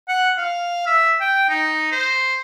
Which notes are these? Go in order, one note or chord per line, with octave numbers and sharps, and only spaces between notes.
F#5
F5
E5
G5
D#4
C5